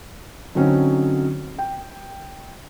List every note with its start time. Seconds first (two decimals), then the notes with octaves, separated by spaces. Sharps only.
0.55 D3 F#3 C4 C#4 D#4
1.58 G5